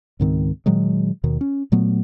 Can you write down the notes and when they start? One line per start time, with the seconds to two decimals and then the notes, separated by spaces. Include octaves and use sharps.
0.20 C#2 G#2 D#3 C4
0.66 A#2 D#3 F#3 G#3
1.24 D#2 B2 D#3
1.41 C#4
1.72 A#2 F#3 A3 B3